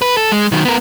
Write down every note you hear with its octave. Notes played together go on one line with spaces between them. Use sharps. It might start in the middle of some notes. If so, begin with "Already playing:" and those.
B4
A4
G#3
D#3 F#3
B3 A#4